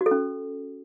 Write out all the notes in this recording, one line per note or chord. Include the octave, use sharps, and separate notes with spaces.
F#4
A4
C#4